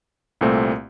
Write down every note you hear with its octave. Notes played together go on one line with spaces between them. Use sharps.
C2 A#2 A3 C4